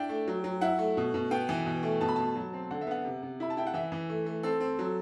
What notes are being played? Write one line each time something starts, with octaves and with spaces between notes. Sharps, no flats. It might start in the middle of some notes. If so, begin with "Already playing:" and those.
Already playing: D4 E4 G5
A3
F#3
F#3
E4 F#5
A3
B2
B2
B3 G5
E3
B2
A3
B2 A5
B5
B2 A5
F#3
C4
D3 F#5
E5
B3 F#5
C3
C3
E4 B5
A5
E4 G5
F#5
E3 E5
E3
A3
A3
C4 A4
C4
F#3